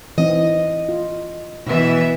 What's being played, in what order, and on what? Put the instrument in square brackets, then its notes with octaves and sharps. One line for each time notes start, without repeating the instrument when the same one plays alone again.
[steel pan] E3 C4 D#4 [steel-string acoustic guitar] D#5
[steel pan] F4
[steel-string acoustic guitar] B2 B3 [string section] E3 E5